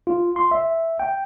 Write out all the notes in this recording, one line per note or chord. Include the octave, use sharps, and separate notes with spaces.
F4
C6
E5
G5